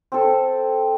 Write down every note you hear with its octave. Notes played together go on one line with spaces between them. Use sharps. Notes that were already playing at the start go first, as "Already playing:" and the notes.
C4 A4